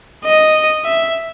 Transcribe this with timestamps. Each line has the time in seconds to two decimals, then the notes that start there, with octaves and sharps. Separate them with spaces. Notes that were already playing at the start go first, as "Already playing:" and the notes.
0.25 D#5
0.85 E5